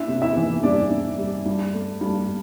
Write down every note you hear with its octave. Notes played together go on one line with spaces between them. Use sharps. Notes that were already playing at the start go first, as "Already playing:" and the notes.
Already playing: D4 E4 E5
C3
E4 E5
E3
G3 D4 D5
D4
G3
G2
A3
G2